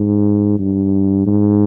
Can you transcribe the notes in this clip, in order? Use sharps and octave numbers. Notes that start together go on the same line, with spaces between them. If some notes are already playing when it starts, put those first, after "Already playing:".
Already playing: G#2
G2
G#2